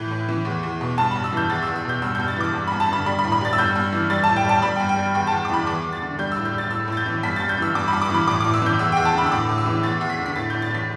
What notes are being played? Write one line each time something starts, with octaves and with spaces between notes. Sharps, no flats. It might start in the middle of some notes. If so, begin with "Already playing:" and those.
Already playing: A2 E3 G6
A2
E3
E2
E2
B2
G2 A5
G2 B5
E6
E3 G6
E2 A6
E6
E2
E6
B2 G6
G2 E6
G2 G6
A6
E3 D6
G2
G2 B5
A5
D3 B5
G3 B5
B5
A2
B5
G3 A6
E6
G2 G6
G2
E3
G3 A6
A2 A5
G5
G3 A5
G3 B5
G2 G5
G5
G3
E2 G5
E2 A5
D6
E3 B5
E2 D6
E2
A6
D3
G3 G6
A2 E6
G6
G3
A6
A2 E6
A2 A6
G6
E3
G2 B6
G2 A6
G6
E3 E6
G2 D6
B5
G2
D6
E3 B5
A2 D6
A2 D6
E6
E3 G6
E2 E6
E2 G5
A5
D3 B5
E6
A2 D6
A2
E6
E3
E2 A6
E2
B6
D3
B6
A2 A6
A2 G6
A6
E3 B6